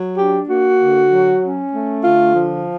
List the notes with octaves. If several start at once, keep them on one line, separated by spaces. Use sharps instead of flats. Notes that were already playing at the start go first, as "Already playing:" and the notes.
Already playing: F#3
D4 G4
A#3 F#4
D3
F#3
C#4
A3
D3 F4
F3